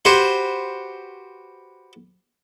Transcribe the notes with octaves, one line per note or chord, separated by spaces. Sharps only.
F#4 G4 B4 C5 G#5